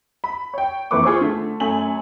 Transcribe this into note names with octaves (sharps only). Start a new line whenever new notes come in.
B5
C#5 G5
F2 E3 A#3 B4 C#6 D6
F4 G#4 C5 C#6
D3 A3
F#2 A3 G#5 F#7